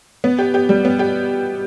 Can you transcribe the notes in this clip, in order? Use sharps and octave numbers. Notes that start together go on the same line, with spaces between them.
B3
G4
G4
G3
B3
G4